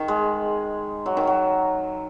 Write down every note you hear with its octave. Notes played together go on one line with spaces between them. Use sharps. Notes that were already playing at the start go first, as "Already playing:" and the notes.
Already playing: D#3
G#3
F#3
D#3
F#3